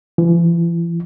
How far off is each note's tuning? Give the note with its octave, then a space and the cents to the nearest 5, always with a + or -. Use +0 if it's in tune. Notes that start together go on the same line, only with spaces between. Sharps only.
E3 +40